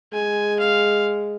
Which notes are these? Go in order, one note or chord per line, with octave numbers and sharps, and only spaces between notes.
G#3 G#5
F5